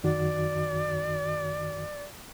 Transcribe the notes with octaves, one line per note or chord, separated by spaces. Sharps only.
F#2 D#3 F#4 D5